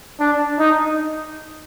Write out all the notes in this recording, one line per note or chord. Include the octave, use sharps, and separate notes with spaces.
D4
D#4